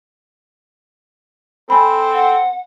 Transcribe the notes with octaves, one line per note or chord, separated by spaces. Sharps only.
C4 A4 G#5 B5
F#5